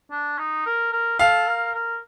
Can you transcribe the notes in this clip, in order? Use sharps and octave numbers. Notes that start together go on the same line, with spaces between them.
D4
D#4
A#4
A#4
A4 F5
A#4
A#4